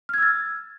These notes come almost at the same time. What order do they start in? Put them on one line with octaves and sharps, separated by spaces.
F6 G#6 E6 A6